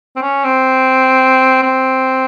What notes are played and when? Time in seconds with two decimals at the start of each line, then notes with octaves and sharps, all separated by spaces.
0.16 C4
0.22 C#4
0.44 C4
1.63 C4